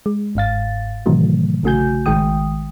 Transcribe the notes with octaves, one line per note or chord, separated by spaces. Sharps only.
G#3
G1 G#2 F5 A6
A2 C3 D#3 E3 F#3 A3
A#1 C#3 A3 F#4 G#5 G6
A1 D#3 G#3 G5 D#6